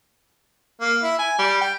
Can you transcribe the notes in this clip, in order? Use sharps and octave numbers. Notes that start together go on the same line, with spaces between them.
A#3
E4
G#5
G3
G5